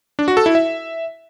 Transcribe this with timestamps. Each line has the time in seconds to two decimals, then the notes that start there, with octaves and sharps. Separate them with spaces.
0.19 D4
0.28 F#4
0.37 A4
0.46 E4
0.55 E5